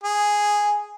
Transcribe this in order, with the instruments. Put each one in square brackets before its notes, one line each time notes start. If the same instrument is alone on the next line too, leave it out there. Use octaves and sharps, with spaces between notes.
[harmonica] G#4